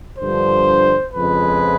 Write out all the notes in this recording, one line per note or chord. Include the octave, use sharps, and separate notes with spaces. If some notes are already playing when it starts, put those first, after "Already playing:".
G2 D3 F3 C5
F2 C#3 F3 G#3 B4